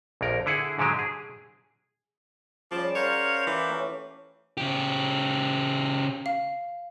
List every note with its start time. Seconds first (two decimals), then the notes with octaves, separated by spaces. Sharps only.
0.21 A#1 F2 A#4
0.46 D3 E4 G#4 F#5
0.79 G#2 D3 F#3 G#3 G4
0.99 G#4
2.71 C#3 F3 G3 A5 D6
2.95 A#4 C5 C#5 F5 F#5
3.47 E3 D6
3.69 A3 C#4 G4
4.57 C#3 G4
6.26 F5